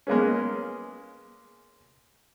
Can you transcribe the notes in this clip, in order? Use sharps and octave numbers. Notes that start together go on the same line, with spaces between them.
G#3 A#3 B3 C#4